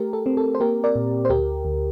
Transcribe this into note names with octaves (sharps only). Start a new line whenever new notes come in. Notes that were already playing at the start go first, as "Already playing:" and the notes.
Already playing: A3 G4 A#4
A4
C4
A4
C5
A#3 G4 A#4
A#4 D5
A#2
C5
D2 G4 A#4
D2